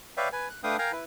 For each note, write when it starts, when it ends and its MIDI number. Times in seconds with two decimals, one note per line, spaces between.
0.17 0.29 71
0.17 0.29 73
0.17 0.29 74
0.17 0.29 76
0.17 0.29 77
0.17 0.29 79
0.33 0.49 71
0.33 0.49 80
0.50 0.61 90
0.63 0.77 57
0.63 0.77 62
0.63 0.77 71
0.63 0.77 77
0.63 0.77 79
0.63 0.77 87
0.79 0.92 70
0.79 0.92 77
0.79 0.92 79
0.79 0.92 80
0.79 0.92 82
0.92 1.05 64
0.92 1.05 71